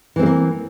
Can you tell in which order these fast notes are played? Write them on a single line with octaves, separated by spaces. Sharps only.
E3 C4 G#3 A#3